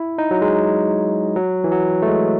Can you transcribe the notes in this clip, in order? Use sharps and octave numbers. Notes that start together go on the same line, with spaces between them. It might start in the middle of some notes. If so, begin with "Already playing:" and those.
Already playing: E4
D#4
F#3
G#3
F#3
E3
F#3
A3
G#3